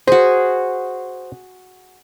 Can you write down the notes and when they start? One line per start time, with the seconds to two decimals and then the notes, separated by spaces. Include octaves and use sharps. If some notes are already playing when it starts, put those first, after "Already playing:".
0.07 F#4 G#4 C5